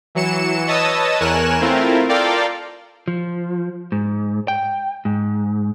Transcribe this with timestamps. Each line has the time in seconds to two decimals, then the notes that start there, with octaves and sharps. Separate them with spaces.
0.15 E3 F#3 C#7 E7
0.67 B4 C#5 D#5 A5 D#6 E6
1.20 E2 A#4 C#5 G#5 F#6 E7
1.60 A3 C4 E4 F4 A#4
2.09 F4 A4 A#4 D5 F5 G5
3.08 F3
3.92 G#2
4.48 G5
5.05 G#2